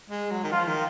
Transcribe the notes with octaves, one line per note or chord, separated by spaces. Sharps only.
G#3
F#3
D#3
F3 F4
D#3